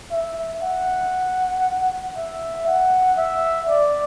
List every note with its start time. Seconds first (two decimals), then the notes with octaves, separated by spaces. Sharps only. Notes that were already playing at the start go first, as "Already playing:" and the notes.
0.12 E5
0.62 F#5
2.16 E5
2.67 F#5
3.18 E5
3.69 D5